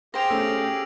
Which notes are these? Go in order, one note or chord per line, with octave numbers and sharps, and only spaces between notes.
G4 G#4 C5 F5 G5 A#6 D7 F7
A3 C#4 E6